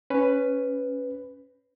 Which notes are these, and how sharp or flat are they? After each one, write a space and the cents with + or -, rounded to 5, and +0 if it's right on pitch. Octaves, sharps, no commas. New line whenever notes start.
C#4 +0 B4 +10